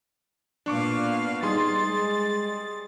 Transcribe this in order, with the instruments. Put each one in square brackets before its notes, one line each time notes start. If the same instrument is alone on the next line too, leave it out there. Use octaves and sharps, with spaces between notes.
[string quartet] A#2 B3 F5 [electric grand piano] D4 C#6 D6
[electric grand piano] G3 G#4 C6 [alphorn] D#4 [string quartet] A6
[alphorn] G#3